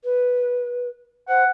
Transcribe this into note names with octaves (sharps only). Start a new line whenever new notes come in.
B4
C5 F#5